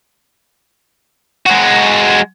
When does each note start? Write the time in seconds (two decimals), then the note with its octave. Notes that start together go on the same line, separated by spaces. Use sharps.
1.46 G#3 F#4